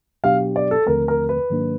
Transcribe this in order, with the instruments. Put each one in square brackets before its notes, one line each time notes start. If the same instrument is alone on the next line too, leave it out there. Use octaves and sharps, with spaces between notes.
[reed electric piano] B2 F#3 B3 D4 G4 [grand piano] F5
[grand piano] D5
A4
[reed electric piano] D#2 D3 F3 A3 C4 [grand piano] A#4
[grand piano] A#4
B4
[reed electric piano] G#2 D#3 F#3 A#3 D4